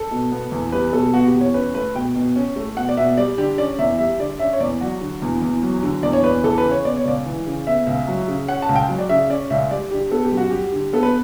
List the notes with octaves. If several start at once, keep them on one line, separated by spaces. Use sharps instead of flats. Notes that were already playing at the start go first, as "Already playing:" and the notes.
Already playing: A4
B2
B3
E2
G3 B4
B2 A4
B3 F#4
G4
E2
C#5
C#4 B4
A3 B4
B2 G5
B2
C#4
A3
B2 F#5
D5
B2 E5
G3 D5
D3 G4
C#4 D5
E2 E5
G3 E5
D3 D5
C#4 E5
C#5
E2 D5
F#3 F#4
D3
E2
E2
F#3
D3
E2 D5
C#5
E2 B4
E3 A4
B4
C#3
C#5
B3 D5
C#5
C#2 D5
E3
C#3
B3 E5
C#2
F#3
C#3
C#4 F#5
A5
C#2
G5
F#3
D5
C#3 E5
C#4 D5
C#2 E5
G3 D5
D3 G4
B3 A4
G4
F#2
F#4
G3 G4
D3
B3 A4
B4